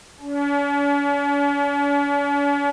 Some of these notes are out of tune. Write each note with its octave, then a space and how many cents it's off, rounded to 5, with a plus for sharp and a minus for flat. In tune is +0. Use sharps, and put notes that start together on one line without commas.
C#4 +45